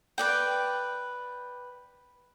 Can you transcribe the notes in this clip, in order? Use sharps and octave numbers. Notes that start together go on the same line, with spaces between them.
B4 D5 G5